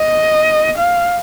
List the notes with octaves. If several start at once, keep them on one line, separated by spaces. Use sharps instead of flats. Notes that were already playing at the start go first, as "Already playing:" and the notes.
Already playing: D#5
F5